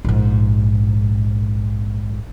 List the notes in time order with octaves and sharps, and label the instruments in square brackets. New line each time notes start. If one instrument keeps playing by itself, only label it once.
[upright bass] A#1 G#2